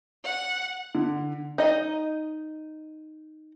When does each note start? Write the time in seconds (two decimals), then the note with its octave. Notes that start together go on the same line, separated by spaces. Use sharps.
0.24 F#5
0.95 D3
1.58 D#4 D#5